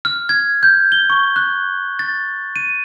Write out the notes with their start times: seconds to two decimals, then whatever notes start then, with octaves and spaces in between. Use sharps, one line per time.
0.05 F6
0.29 G#6
0.63 G6
0.92 G7
1.10 C#6
1.36 F#6
1.99 A6
2.56 D#7